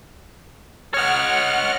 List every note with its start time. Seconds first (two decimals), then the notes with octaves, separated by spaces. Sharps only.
0.94 C#5 D#5 F#5 F6